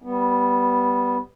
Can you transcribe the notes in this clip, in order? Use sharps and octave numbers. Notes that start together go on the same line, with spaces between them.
G3 B3